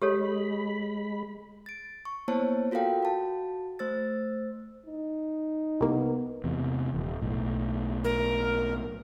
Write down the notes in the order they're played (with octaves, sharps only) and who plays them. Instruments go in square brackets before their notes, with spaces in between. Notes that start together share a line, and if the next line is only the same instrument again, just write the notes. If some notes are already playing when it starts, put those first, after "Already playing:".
[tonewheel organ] G#3 B5 [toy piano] G4 A4 C#5
[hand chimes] A6 D7
C#6
A#3 B3 E4 C5 C#5 A5
F4 F#4 A4 A#4 F5 G5
F#4 A5
A3 C5 E6 A6
[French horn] D#4
[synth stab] C2 A#3 [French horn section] B3 A#4
[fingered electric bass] E2 C3
D#1
B1 A2
[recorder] A#4